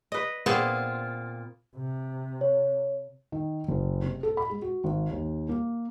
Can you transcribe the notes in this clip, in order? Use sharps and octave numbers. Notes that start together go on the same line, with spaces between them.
B4 D#5
A#2 B3 C4 F4 G#4
C3
C#5
D#3
F#1
C3
A4
B5
G#3
F#4
G#1
D#2
A#3